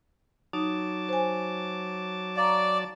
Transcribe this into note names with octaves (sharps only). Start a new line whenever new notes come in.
F#3 D#4 A5 D6
C5 G#5
D5 F5 A#5 C#6